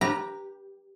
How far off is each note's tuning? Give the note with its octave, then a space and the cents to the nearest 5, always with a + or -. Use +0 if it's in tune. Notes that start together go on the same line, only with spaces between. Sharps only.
G4 +0 B4 -25 A#5 +0